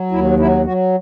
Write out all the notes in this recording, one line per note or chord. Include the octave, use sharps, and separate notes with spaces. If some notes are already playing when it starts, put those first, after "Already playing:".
Already playing: F#3
D#2 E4
F#3 E4
F#3 F#4